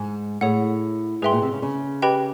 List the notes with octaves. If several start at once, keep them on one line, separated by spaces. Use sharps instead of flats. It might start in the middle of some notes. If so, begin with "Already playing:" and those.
Already playing: G#2
A2 G#4 C#5 F#5
G#2 G#4 B4 E5 G5 C6
A#2
C3
C#3
C#3
G4 B4 D#5 G5 B5